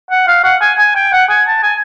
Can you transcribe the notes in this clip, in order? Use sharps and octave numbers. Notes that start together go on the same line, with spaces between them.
F#5
F5
F#5
G#5
G#5
G5
F#5
G#5
A5
G#5